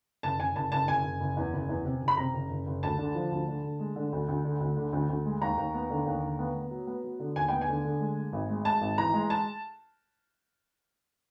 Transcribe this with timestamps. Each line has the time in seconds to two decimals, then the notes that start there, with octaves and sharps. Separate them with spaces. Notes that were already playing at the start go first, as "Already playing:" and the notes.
0.23 F#1 A5
0.40 F#1 G#5
0.55 F#1 A5
0.72 F#1 A5
0.88 F#1 G#5
1.04 F#1
1.20 F#1
1.37 E2
1.53 F#1
1.69 E2
1.85 C3
2.01 F#1
2.08 B5
2.17 C3 A#5
2.34 F#1
2.50 F#1
2.67 F#1
2.83 D2 A5
2.98 D3
3.15 F3
3.31 D2
3.48 D3
3.63 D3
3.79 G#3
3.96 D3
4.12 D2
4.28 D2
4.44 D3
4.60 D2
4.77 D3
4.93 D2
5.09 D2
5.25 G#3
5.41 D#2 A#5
5.57 D#2
5.74 B3
5.90 D3
6.06 D#2
6.23 D3
6.39 B3
6.55 B3
6.71 F#3
6.87 B3
7.04 F#3
7.19 D3
7.36 D#2 G#5
7.48 B3 G5
7.61 G#5
7.68 D3
7.85 D3
8.00 G#3
8.17 G#3
8.33 G#1
8.49 G#3
8.65 G#3 A5
8.81 G#1
8.98 E3 A#5
9.14 G#3
9.30 A5